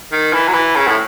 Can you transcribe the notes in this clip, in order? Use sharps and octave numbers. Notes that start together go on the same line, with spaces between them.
D#3
E3
F#3
E3
C#3
A2